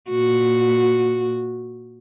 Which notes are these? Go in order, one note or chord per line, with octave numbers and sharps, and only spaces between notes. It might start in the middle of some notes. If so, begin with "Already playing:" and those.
A#2 F#4